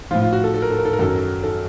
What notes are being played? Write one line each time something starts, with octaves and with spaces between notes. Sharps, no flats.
A2 F3 F4
F4
F#4
A4
A4
A#4
A4
A#4
A4
A#4
F#2 D#3 F#3 A4
A#4
A4
A4